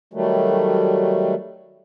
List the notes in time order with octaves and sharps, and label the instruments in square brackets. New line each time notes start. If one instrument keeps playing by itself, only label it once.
[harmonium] D#3 F#3 G3 A3